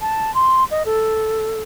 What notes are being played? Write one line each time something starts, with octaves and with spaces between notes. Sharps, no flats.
A5
C6
D#5
A4